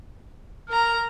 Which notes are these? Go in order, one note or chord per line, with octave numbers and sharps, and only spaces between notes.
A#4 A#5 F6